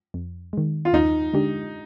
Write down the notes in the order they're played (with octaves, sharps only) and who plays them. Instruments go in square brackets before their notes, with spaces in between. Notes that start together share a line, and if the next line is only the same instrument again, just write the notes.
[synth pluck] F2
D#3 G#3
[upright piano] F4
[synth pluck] D#2 [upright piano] D#4
[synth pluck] D3 G#3 D4 G4